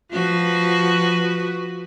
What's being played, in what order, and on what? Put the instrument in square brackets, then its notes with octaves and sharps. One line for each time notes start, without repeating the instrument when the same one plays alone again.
[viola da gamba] F3 F#4 B4